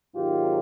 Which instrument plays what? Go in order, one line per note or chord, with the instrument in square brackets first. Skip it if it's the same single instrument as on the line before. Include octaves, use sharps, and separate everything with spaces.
[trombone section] G#1 G#2 D#3 F#3 F4 G4